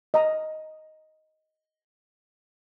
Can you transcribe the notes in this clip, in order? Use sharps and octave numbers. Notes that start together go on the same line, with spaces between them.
D#5 A#5